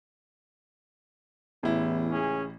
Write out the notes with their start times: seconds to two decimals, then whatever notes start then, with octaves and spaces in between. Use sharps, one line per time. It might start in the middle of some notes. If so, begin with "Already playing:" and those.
1.63 A1 E2 E4
2.10 C#2 C#4 G#4